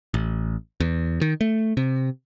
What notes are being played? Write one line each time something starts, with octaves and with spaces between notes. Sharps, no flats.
A1
E2
D#3
A3
C3